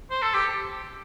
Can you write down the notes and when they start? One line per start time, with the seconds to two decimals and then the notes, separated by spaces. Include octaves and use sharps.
0.10 C5
0.22 A4
0.34 G4